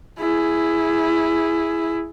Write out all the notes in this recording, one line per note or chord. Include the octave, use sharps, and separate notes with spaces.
E4 G#4